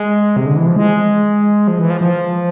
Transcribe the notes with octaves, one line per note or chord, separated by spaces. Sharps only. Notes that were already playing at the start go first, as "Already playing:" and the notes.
Already playing: G#3
C3
D3
E3
F3
G#3
F3
E3
F3
F3